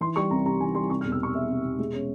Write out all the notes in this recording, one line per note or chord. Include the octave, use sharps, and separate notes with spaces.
E3 C6
G3 C#6
C2 A#5
C3 A#5
E3 G#5
G3 C6
C3 C#6
F6
E1
E6
E1 C#6
E2 E5
C3
E1
G#3
C#4